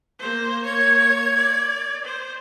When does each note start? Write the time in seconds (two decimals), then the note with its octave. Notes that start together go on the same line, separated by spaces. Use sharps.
0.19 A#3 C5
0.64 A#3 C#5 G#6
1.37 D5
2.04 C5